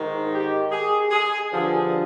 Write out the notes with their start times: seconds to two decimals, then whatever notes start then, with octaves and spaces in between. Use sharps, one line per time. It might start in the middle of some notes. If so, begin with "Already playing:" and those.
Already playing: G#2 D#3
0.32 G4
0.71 G#4
1.11 G#4
1.51 G2 D3 F3 G#4